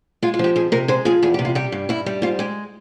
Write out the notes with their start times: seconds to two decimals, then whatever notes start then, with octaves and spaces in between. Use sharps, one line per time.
0.22 G#3 F4
0.34 F4
0.39 F3 G4
0.56 F2 G#4
0.72 C3 A#4
0.88 G#3 C5
1.05 F3 G#4
1.22 E2 G#4
1.34 G4
1.39 C3
1.45 F4
1.55 G3 G4
1.72 G2
1.89 G2 E4
2.06 G3
2.22 G#2 F4
2.39 G#3 G4